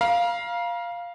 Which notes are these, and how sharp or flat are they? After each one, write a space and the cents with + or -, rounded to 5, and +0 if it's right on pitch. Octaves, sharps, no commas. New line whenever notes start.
F5 +0 A#5 +40